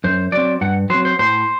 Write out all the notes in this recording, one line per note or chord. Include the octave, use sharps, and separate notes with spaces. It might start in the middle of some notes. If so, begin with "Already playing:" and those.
F#2 C5
F#3 C4 D5
G2 F#5
F#3 C4 C5
C5
A2 C5